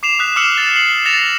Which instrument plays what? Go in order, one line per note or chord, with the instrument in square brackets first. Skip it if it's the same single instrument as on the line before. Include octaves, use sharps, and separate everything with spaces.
[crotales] D6 C7 E7 F7
D#6 F#6 B6
D6 E6 F6 C#7 E7 F#7
A6 C7
C7 F#7
A6 A#6 C7 C#7 E7 F7